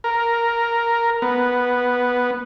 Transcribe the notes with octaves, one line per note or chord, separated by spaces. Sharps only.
A#4
B3